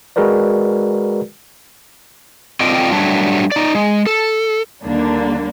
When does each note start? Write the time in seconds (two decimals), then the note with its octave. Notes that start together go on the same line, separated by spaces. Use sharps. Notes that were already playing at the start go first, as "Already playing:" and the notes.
0.16 G#3 F#4 G#4 A#4 B4 D5
2.60 C4 F4 A4 D5 D#5 G5
2.92 F#3 G3 A3 D4
3.52 D#4 D5
3.75 G#3
4.07 A4
4.83 D#2 D3 G3 A#3 D4